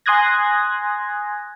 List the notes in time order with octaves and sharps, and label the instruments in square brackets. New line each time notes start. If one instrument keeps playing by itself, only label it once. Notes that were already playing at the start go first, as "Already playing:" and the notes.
[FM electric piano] G#5 C6 D#6 F#6 G#6 A#6